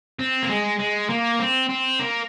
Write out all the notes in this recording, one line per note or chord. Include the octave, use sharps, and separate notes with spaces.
C4
A#3
G#3
G#3
A#3
C4
C4
A#3